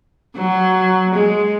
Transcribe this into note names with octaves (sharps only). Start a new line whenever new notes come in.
F#3
G#3